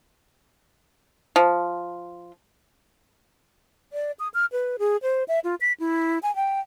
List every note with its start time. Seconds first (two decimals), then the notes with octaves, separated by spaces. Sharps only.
1.36 F3
3.93 D5
4.20 D#6
4.34 F6
4.52 B4
4.79 G#4
5.02 C5
5.28 E5
5.44 F4
5.61 B6
5.80 E4
6.23 G#5
6.36 G5